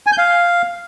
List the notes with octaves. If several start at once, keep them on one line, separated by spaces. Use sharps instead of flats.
G#5
G6
F5